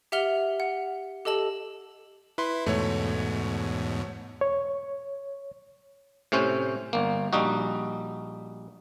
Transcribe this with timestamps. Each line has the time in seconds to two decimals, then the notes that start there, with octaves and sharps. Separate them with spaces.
0.12 G4 E5 F#5 F6 F7 G7
0.60 F#5
1.25 G4 A4 D#5 A5 F#7
2.38 E4 B4 C6
2.66 E2 G#2 B2 A3 C#5
4.41 C#5
6.32 A2 C3 C#4 C5
6.93 G1 A#3
7.33 A#1 G3 D#4 F#4